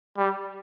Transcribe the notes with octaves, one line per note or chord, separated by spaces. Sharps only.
G3